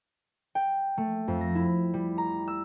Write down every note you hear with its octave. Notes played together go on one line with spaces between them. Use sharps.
G5
A3
F2
A#6
E4
G3
A#5
E6